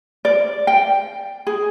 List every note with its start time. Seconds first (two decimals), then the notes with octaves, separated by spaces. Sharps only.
0.25 D5
0.67 G5
1.47 G#4